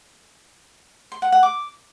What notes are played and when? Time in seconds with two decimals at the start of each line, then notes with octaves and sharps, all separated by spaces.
1.12 C6
1.22 F#5
1.32 F#5
1.43 D6